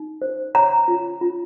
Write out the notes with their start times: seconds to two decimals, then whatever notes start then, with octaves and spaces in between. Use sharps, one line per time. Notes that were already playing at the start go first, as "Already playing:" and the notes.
Already playing: D#4
0.22 C5
0.55 C#5 A#5
0.88 F4
1.21 F4